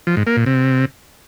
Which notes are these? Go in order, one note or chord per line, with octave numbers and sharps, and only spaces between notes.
F3
G#2
A#3
A#2
C3